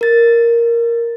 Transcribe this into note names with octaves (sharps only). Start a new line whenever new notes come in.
A#4 A6